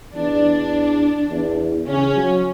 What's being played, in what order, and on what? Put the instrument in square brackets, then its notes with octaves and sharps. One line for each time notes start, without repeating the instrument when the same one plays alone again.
[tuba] E2 [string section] D4
[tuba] E2
[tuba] C#3 [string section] C#4
[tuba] F#3